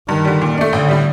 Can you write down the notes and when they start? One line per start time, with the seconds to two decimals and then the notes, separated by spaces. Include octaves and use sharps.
0.09 G2 D#3
0.25 D3 G3
0.41 A#2
0.58 A3 D4
0.73 A1 D3
0.89 A2 G3